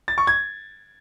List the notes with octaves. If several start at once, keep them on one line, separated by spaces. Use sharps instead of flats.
A6
C#6
G#6